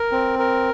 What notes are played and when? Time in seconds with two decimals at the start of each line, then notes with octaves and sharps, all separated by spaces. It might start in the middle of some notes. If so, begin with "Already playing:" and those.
Already playing: A#4
0.12 C4
0.39 A#4